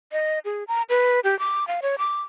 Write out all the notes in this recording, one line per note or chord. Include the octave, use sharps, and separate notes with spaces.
D#5
G#4
A#5
B4
G4
D6
F5
C#5
D6